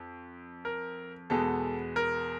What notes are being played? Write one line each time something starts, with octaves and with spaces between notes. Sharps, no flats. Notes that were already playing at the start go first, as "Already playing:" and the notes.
Already playing: F2
A#4
E2 B2 G#3 B3 A4
A#4